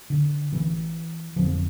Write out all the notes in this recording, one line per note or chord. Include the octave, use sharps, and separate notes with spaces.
D3
A1 A2 E3
G1 F2 D3 F3